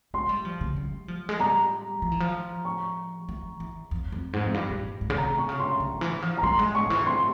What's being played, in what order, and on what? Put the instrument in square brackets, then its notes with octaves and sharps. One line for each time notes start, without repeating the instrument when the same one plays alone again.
[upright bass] G#3 [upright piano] C6
[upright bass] G3
F3
C#3
G3
F3
G#3
[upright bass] G3 [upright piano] A#5
[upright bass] F3
E3
F3
[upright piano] C#6
[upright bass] E3
E3
F2
F2
G#2
F2
G2
A#2
G#2
C#3
[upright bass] C3 [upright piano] A#5
[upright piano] C#6
[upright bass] C#3
[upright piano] C6
[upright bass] C#3
E3
F3
[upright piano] A#5
[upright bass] G3 [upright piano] C6
[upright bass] G#3
[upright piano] C#6
[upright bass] C#3
E3
[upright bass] C3 [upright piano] C6